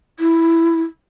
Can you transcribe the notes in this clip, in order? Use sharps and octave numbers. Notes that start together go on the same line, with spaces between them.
E4